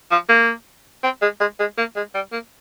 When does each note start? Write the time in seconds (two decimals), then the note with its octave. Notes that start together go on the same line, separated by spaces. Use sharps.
0.11 F3
0.29 A#3
1.04 C4
1.22 G#3
1.40 G#3
1.59 G#3
1.78 A#3
1.96 G#3
2.15 G3
2.32 A#3